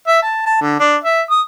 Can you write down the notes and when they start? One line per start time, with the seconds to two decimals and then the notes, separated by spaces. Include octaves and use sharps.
0.07 E5
0.23 A5
0.46 A5
0.61 D3
0.80 D4
1.04 E5
1.31 D#6